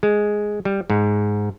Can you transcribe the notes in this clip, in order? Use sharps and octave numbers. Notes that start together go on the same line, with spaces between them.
G#3
G3
G#2